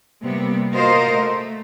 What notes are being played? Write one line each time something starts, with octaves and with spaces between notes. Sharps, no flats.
C3 G3 A#3 B3
F4 F#4 A#4 C5 D#5 F5
A3